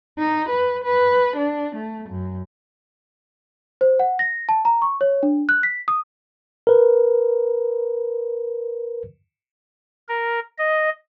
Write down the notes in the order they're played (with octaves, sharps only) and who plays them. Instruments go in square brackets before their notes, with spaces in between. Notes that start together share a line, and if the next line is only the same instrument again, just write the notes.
[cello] D#4
B4
B4
D4
A3
F#2
[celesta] C5
F#5
A#6
A5
A#5
C#6
C#5
D4
F#6
B6
D#6
[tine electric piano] A#4 B4
[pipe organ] A#4
D#5